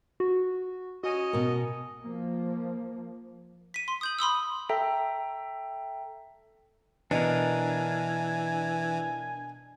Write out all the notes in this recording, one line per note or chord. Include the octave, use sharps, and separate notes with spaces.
F#4
C#4 F#4 D#5
B2 A#4
F3 A#3
B6 D#7
C6
D#6 G6 F#7
B5 C6 D#6 E6
A4 E5 G5 A#5
B2 E3 D4 A#4 G#5